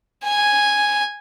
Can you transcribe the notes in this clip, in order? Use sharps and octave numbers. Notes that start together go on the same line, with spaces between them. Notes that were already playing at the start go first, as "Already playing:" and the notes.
G#5